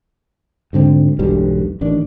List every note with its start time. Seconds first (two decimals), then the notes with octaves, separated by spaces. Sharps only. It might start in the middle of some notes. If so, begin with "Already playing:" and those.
0.73 D2 G#2 D3 C4
1.19 E1 B1 G2 G3
1.81 A1 D#3 D4